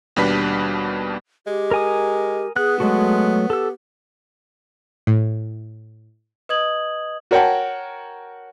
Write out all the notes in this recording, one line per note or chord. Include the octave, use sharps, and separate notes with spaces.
D#2 B2 G3 D4 B4 B6
G#3 G4
A#4 G#5 D#6
B3 G#4 F#6
F#3 G#3 A3 F#4
G4 A4 E6
A2
B4 D#5 D#6 G#6 F#7
F#4 A#4 C#5 F#5 G5 A5